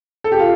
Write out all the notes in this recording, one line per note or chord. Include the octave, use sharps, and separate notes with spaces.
A4
G4
F4